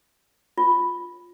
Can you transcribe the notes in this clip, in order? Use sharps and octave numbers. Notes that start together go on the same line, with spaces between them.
F4